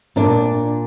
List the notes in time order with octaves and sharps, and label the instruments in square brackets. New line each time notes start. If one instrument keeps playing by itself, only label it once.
[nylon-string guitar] A#2 D4